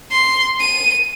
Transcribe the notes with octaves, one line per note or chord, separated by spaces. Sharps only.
C6
D#7